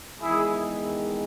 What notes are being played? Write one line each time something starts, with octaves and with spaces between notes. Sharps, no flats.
E2 D#3 G#3 E4 G#4